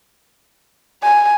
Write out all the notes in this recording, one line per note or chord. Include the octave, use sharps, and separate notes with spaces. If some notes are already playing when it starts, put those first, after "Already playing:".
G#5